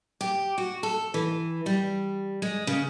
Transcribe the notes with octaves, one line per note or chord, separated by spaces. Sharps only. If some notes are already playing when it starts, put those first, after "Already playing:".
G4
F#4
A4
E3
G3
G#3
C#3